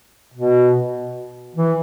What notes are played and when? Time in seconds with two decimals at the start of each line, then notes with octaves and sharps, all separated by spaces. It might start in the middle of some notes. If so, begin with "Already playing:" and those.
0.34 B2
1.55 E3